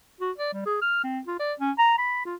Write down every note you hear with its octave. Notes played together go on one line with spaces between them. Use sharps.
F#4
D5
G3
G#4
F6
C4
F4
D5
C#4
A#5
B5
F4